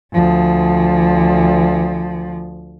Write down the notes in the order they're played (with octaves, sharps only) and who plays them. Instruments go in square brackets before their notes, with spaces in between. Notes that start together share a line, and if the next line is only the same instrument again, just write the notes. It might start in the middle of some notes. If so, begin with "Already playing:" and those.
[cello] D2 F3